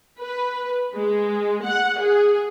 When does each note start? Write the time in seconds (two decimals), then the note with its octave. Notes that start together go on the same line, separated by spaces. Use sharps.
0.21 B4
0.94 G#3
1.65 F#5
2.00 G#4